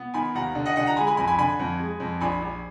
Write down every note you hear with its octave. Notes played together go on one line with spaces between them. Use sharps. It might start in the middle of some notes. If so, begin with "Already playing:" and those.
Already playing: B3
D#3 G#5 B5
D#2 F#5 A#5
D3
D#5 F#5
D3 D#5 F#5
F#5 A#5
G#3 G#5 B5
G#5 B5
F2 G#5 B5
G#5 B5
D3 G#5 B5
F2
G#3
F2
A#1 G#5 B5
A#1